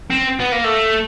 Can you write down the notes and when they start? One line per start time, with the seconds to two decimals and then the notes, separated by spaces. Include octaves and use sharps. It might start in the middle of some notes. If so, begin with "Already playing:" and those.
0.11 C4
0.40 B3
0.52 A#3
0.64 A3